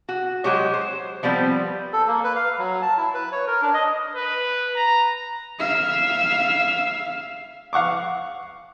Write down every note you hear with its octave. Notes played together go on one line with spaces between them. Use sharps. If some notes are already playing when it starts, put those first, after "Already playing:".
F#4
F#3 G#3 G4 C#5
C5
F3 G3 B3 C4
A4
A#3
B4
F5
F#3
A5
E4
B4
C#5
A#4
D4
D#5
B4
A#5
E5 F5
F5 F#5 C#6 D6